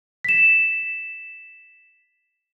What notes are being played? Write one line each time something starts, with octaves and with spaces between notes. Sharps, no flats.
B6 E7